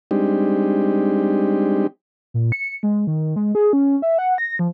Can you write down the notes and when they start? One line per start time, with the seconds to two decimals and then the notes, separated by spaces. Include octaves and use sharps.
0.11 G3 G#3 C4 D4 D#4 G4
2.34 A#2
2.52 C#7
2.83 G#3
3.07 D#3
3.36 G#3
3.55 G#4
3.73 C#4
4.02 E5
4.18 F#5
4.38 A#6
4.59 F3